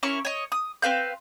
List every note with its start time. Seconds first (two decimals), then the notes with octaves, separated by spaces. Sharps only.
0.03 C#4 E4 A#4 C#6
0.25 C#5 D#5
0.52 D#6
0.82 C4 B4 F5 G6